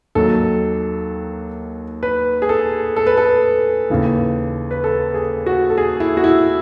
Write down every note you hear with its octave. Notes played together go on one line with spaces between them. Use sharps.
D#2 D#3 F#3 A4
B4
G#4
A4
A4
B4
A4
D#2 C#3 E3
B4
A4
G#4
F#4
A4
G#4
E4
F#4
E4